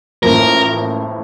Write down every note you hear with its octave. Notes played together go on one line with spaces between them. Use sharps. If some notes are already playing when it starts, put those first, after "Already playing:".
A1 A2 F3 A#3 A#4